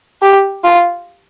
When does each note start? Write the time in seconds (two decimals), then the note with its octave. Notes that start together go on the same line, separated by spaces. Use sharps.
0.22 G4
0.64 F4